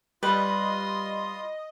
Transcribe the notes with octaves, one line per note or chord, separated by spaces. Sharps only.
G3 F4 B4 D#5 C6 D#6